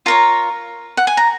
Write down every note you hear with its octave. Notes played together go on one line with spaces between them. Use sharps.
F4 A#4 C#5 A#5
F#5
G#5
A#5